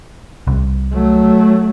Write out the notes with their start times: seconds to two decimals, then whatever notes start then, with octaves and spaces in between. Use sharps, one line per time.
0.47 C2
0.93 F#3 A3